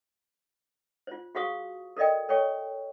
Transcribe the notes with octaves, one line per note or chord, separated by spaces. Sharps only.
F4 C5
F#4 G#4 C5 F5 C#6 D#6
A4 A#4 D5 D#5 G5
A4 C#5 G5 C#6